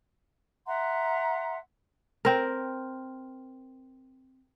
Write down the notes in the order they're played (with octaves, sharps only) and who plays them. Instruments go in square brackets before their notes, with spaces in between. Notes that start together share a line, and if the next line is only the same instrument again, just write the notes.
[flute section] E5 F#5 A#5 C6
[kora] C4 A#4